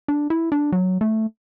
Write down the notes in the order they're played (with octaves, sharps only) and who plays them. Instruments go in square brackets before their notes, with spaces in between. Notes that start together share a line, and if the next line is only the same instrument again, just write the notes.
[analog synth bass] D4
E4
D4
F#3
A3